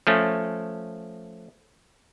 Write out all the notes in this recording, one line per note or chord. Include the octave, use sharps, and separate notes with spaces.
F3 A3 C#4